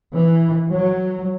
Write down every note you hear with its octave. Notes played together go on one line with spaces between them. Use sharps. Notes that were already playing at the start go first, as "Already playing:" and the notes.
E3
F#3